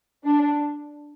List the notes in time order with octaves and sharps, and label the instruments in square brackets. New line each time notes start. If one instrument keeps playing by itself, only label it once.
[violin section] D4